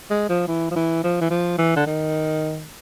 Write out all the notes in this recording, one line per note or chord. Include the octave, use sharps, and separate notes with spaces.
G#3
F3
E3
F3
E3
F3
E3
F3
E3
D3
D#3